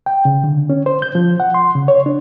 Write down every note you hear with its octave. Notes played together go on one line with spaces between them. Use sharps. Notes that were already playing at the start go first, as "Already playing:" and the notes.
G5
C#3
D3
C#4
C5
G6
F3
F#5
C6
C#3
C#5
D4